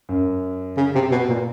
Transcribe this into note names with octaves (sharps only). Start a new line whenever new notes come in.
F#2
C#3
C3
B2
A#2